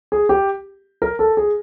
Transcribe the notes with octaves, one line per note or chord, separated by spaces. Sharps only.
G#4
G4
A#4
A4
G#4